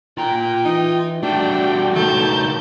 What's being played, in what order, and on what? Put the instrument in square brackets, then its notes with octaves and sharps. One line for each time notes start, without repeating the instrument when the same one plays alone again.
[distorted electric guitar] F4 A#5 [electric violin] G5
[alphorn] E3 [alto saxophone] D#4
[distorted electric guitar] G3 A3 [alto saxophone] D4 [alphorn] F#4 [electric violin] G5
[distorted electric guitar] C#2 D#3 [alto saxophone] A3 [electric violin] A5 G6